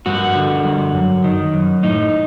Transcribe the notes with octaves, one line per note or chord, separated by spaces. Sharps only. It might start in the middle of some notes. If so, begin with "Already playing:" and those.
G2 F#4
D3
G2
F#2
D#3
F#2
A2 D#4